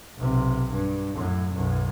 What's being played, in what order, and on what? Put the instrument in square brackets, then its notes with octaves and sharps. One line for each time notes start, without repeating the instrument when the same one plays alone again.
[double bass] B1 C3
G2
F#2 A2
B1 F#2